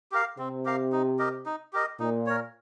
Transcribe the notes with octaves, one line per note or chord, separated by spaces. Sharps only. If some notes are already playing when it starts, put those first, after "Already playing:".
G4 A#4 F5
C3 C4
G4 A#4 F5
D#4
G4 A#4 D#5
D#4
G4 A#4 D#5
A#2 D#4
A#4 C#5